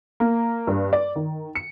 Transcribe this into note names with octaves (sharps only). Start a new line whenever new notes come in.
A#3
G2
D5
D#3
C#7